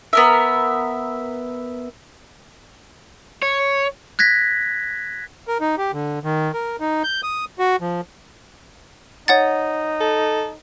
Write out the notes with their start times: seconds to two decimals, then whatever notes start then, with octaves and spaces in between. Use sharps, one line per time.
0.13 B3 A#4 E5
3.42 C#5
4.19 F#6 G#6 A#6 B6
5.47 A#4
5.61 D#4
5.78 G4
5.93 D3
6.24 D#3
6.54 A#4
6.80 D#4
7.04 G6
7.23 D#6
7.59 F#4
7.81 F3
9.28 D#4 C#5 F#5 A6
10.01 A4